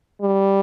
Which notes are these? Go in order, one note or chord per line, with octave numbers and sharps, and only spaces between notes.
G3